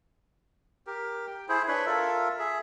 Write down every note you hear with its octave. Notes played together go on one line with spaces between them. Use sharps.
G4 A#4
G5
E4 G#4 C5
D4 B4 C#5 B5
F4 A4 A#4 E5
G#4 E5